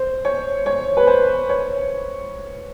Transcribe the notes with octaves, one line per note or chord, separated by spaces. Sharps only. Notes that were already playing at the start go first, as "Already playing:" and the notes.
Already playing: C5
C#5
C#5
B4
C5
C#5